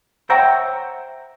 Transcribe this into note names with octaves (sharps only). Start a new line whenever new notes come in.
C5 C#5 E5 F#5 G5 A#5